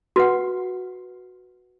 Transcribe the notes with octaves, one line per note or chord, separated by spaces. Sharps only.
F#4 B4 F#5